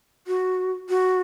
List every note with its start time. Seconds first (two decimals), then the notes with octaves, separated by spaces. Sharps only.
0.27 F#4
0.89 F#4